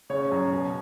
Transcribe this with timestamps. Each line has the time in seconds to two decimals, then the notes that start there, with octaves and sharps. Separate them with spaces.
0.10 C#3 C#5
0.32 F#2
0.52 B2